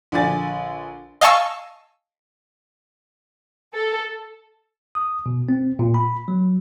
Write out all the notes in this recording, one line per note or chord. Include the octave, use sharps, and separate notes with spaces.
A#1 D3 D5 G#5 A6
D#5 F5 G#5 A5 C#6 E6
A4
D#6
B2
C4
A#2
B5
F#3